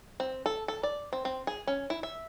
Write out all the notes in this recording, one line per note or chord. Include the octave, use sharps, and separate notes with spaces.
C4
A4
A4
D5
C4
C4
G#4
C#4
E4
E5